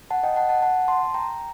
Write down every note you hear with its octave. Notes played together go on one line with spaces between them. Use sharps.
F#5 A5
D#5 G5
F#5 A5
F#5 A5
F#5 A5
A5 C6
G5 A#5